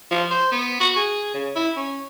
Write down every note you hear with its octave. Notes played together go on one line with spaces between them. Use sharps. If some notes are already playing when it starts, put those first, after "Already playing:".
F3
C5
B3
F#4
G#4
C#3
E4
C#4